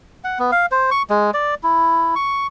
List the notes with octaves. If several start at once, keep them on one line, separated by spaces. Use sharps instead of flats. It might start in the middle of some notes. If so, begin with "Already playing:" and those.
F#5
B3
F5
C5
C#6
G#3
D5
E4
C#6